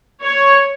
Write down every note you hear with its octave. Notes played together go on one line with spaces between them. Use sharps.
C#5